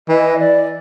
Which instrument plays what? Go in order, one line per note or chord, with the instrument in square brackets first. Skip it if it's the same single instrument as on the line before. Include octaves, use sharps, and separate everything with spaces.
[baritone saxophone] E3 [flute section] D#5
[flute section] D5